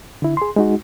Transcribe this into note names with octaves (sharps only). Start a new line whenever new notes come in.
D3 E4
G#4 C6
G#3 D#4 F#4